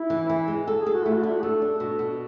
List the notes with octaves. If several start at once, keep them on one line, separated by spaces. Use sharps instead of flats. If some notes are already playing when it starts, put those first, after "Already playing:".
Already playing: E4
E3
E3
G#3
A4
G#4
A4
F#4
A3 E4
F#4
D4 E4
F#4
A3 A4
D4
B2
B2